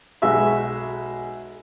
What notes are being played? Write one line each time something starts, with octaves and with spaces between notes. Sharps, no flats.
B1 G#3 F#4 E5 E6